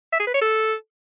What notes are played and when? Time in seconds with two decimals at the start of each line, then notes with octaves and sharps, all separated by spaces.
0.12 E5
0.19 G#4
0.27 B4
0.34 C#5
0.41 A4